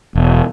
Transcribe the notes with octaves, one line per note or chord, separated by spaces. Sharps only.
E1